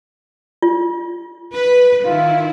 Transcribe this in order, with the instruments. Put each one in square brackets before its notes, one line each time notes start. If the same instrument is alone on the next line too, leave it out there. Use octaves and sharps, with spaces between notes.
[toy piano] F4
[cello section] B4
[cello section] D#3 E4 [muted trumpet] F4